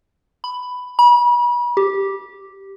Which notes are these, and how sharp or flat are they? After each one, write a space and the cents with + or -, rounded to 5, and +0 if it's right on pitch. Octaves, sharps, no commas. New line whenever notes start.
B5 +10
B5 -35
G4 -5